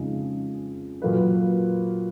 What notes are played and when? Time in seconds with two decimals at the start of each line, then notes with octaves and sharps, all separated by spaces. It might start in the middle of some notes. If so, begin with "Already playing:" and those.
Already playing: F2 C#3 G#3 D#4 G#4
1.02 A#2 F#3 A#3 F4 B4